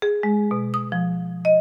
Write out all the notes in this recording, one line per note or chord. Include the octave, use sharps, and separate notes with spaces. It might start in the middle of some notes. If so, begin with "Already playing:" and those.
G#4
G#3
B2
D#6
F3
D#5